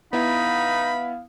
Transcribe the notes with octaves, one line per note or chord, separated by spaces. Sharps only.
B3 D#4 E4 F5 B5